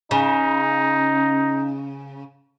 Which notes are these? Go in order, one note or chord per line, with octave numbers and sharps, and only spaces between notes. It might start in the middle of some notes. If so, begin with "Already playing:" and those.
C#3 D#4